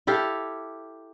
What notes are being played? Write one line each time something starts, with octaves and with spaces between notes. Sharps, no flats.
E4 G4 A4 F5